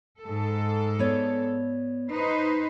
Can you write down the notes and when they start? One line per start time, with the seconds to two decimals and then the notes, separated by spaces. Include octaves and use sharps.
0.23 G#2 A4
0.99 B3 C#5 D5
2.12 D#4 B4 C5